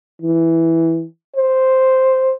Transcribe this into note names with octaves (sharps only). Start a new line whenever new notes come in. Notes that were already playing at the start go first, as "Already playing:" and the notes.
E3
C5